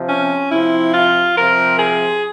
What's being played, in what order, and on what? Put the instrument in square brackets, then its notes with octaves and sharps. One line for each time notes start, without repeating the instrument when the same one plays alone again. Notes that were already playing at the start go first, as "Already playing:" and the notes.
Already playing: [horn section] C3 F3
C#4
C3 F3 E4
F4
C3 F3 A#4
G#4